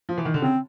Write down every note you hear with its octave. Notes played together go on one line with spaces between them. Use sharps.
F3
E3
D#3
D3
C#3 C4